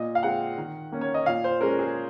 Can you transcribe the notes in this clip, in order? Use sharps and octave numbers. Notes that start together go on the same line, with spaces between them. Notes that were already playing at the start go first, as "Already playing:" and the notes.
Already playing: A#2 D#5
F5
G#3 C4 F#5
D#3
A#3 C#4
C#5
D#5
A#2 F5
C5
G#3 C#4 A#4
G#4